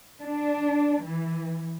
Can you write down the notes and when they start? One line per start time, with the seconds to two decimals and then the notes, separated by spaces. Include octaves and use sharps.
0.22 D4
1.05 E3